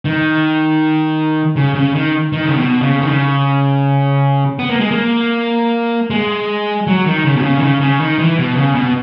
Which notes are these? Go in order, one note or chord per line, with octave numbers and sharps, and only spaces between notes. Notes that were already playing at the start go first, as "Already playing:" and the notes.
D#3
C#3
C#3
D#3
D#3
C#3
B2
C#3
D#3
C#3
B3
A#3
G#3
A#3
G#3
F#3
D#3
C#3
B2
C#3
D#3
C#3
C#3
D#3
E3
B2
C#3
B2